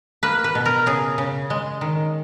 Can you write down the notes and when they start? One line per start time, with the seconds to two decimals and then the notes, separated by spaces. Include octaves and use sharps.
0.23 A#3 B4
0.44 B4
0.55 B2
0.66 A#4
0.86 C#3 G#4
1.18 C#3
1.50 G#3
1.81 D#3